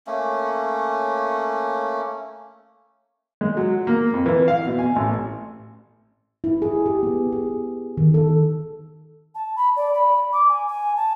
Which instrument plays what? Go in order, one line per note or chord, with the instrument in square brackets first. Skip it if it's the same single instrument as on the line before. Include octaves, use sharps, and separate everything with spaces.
[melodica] A3 A#3 C#4
[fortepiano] G#3
F#3
A#3
F2
E3
F5
B2
G#5
A1
[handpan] E4
G#4
G4
B3
G#4
D#3
A4
[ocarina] A5
B5
D5
B5
D6
G#5
G#5
A5